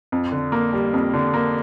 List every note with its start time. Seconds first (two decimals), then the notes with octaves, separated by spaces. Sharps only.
0.12 F2
0.32 D3
0.52 A#3
0.73 G3
0.94 F2
1.13 D3
1.34 A#3